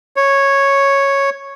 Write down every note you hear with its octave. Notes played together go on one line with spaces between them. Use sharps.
C#5